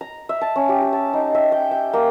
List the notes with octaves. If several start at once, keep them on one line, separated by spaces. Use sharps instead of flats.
A#5
E5
A5
C#4
G4
G4
A5
D#4
E5
G5
G5
A#3